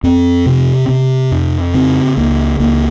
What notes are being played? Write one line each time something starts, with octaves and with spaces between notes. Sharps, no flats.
F2 C4
C3
C3
F2
C#3 C4
C#2 A#3
C#2 A#3